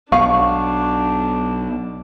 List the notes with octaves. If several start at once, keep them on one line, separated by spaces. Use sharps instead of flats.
B1 B2 D4 F5 C#6